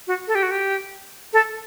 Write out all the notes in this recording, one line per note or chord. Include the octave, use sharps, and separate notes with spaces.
F#4
A4
G4
F#4
G4
A4